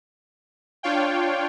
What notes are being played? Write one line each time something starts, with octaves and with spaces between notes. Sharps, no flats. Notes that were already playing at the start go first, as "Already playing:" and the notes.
D4 F4 C#5 F5 G5